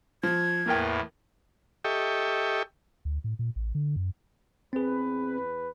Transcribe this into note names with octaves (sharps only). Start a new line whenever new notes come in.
F3 G#6
E2 A2 E3 A#3 A#4 G5
G4 A4 D#5 E5 G5 C#6
D2
A2
A#2
A1
D3
F#2
E2 C4 G#4 B4